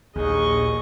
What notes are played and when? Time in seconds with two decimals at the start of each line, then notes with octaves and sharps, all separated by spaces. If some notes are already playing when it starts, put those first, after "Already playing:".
0.16 A#1 D#2 G#4 D#5 C#6